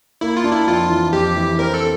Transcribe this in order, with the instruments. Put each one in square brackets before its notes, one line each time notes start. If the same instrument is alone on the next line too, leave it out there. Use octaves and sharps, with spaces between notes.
[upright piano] A#3 [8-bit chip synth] E4
[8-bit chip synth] F4
[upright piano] D4
[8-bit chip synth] E4
[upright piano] F2 [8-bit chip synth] F4
[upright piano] E3
[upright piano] F2 [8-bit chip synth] G4
[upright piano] E3
[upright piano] C4 [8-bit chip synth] A#4
[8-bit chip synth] A4